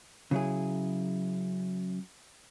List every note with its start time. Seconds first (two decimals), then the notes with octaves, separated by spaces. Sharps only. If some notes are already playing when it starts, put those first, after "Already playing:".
0.31 C#3 F#3 E4 G#4